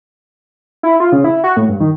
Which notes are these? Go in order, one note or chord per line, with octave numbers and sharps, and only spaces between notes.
E4
F4
C#3
E4
F#4
A2
G2
D#3